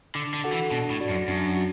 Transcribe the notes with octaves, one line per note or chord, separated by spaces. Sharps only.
D3 D4
D3
F#4 A4 F#5
E3
B2 D4
A2
F#4 D5 F#5
F#2
F#2 D4
F#4